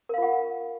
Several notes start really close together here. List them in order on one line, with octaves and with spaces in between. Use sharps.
A#4 F5 F4 F#5